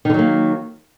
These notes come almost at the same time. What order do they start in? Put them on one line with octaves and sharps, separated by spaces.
D#3 D3 F#3 A#3